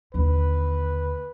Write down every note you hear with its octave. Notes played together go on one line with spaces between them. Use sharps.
D#2 D3 B4